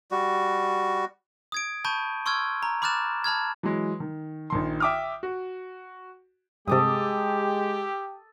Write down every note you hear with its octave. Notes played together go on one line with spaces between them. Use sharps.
G3 F#4
D#6 G#6 D7
A5 B5 C#6 G6 D#7
C6 C#6 E6 F6 G#6
A#5
B5 D6 F6 F#6 A6 E7
A5 B5 F6 G#6
E3 F#3 G#3
D#3
A#1 D#3 C6
E5 G5 D6 D#6 F6
F#4
G2 C3 G#3 G4 A4 D6 D#6